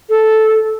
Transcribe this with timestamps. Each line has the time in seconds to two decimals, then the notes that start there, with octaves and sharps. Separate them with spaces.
0.10 A4